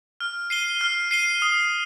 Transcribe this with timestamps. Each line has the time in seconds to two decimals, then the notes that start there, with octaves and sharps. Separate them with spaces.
0.20 F6
0.50 C7 D#7 G7
0.81 F6
1.11 C7 D#7 G7
1.42 D#6